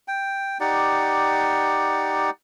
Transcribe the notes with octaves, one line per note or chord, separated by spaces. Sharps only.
G5
D#4 G4 D5 F#5